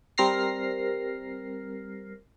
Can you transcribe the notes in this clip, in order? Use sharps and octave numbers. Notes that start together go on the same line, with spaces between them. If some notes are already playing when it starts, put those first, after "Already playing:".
G3 C4 A#4 F6 A#6 C7